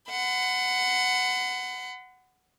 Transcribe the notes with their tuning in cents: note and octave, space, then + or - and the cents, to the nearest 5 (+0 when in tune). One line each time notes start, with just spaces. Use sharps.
F#5 +0 B5 +40